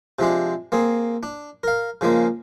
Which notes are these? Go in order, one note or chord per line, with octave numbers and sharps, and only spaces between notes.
C3 F3 G#3 D4
A#3 C4 G#4
D4
A#4 F5
C#3 F3 G#3 A#3